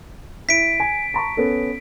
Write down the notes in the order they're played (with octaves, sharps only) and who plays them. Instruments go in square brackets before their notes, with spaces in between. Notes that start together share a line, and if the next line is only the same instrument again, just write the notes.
[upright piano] E4 [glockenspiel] B6 D7
[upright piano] G#5
A5 A#5 C#6
B3 C#4 A4